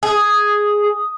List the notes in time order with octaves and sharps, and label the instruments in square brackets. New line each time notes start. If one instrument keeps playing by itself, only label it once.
[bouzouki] G#4 [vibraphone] D#6